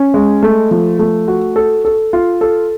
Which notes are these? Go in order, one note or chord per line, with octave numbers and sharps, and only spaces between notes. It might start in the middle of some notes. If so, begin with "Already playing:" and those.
Already playing: C#4
G#3
A3
F3
A3
F#4
A4
A4
F4
A4